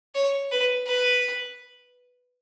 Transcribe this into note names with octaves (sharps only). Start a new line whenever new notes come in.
C#5
B4
B4